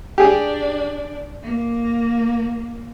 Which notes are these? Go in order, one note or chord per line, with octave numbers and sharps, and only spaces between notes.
D4 G4 G#4
A#3